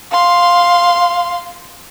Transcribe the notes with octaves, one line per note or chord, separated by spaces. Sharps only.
F5 C6